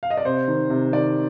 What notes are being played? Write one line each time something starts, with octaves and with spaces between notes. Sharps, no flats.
F5
D#5
D5
C3 C5
D#3
C3
D#3 D5